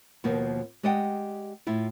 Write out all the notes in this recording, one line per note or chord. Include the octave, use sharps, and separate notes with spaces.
D#2 B2 F3 A#3 B3
G#3 G4 D5 D#5 F#5 G5
A2 E4 F4